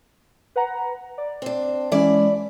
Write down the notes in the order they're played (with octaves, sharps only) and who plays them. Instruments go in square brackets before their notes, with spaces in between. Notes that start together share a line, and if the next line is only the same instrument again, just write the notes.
[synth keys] B4 F#5 A#5
D5
[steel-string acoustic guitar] C4 D4
[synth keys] E3 G#3 C#4 [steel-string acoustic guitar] E4 D5